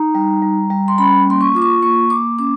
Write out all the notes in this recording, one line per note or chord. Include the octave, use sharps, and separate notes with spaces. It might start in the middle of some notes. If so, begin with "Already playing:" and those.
Already playing: D#4 A#5
G3
G3
G3
C6
C#4 B5
A#3 C6
C#6
F4 D6
C#6
A#3 C#6
A#3 D6
C#4 D6